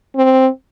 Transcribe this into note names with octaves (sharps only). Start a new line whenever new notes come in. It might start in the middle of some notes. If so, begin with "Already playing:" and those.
C4